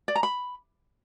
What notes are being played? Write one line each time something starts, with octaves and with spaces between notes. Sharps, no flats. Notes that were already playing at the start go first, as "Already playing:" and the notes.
D5
A#5
B5